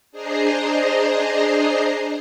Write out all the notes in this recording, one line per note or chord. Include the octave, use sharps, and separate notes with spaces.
D4 G#4 C5 D#5 A#5 C6